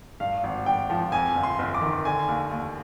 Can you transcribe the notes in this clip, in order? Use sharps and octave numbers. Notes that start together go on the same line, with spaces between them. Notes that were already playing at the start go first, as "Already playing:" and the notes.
G2 F5
G#1
G#1 G5
F3
F2 G#5
G1
C6
G1
D6
D#3
D3 G#5
D#2
D#2